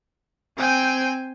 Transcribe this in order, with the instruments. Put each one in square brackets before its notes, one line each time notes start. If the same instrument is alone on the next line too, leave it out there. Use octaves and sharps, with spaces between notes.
[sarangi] C4 [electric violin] G5 G#5